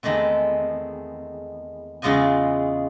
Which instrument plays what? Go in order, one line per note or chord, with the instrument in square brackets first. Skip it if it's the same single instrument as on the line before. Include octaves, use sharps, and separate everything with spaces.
[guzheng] E2 D#3 G#3 A3 C4
E2 C#3 G#3 F4 D#5 G#5